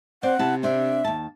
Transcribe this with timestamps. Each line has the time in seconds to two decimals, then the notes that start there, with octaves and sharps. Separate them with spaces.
0.23 C4 C5 D5 F#5
0.39 C3 E4 A5
0.63 C4 D4 E5
1.04 D#2 A5